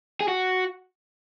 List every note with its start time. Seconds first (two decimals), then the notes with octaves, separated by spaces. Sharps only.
0.21 G#4
0.28 F#4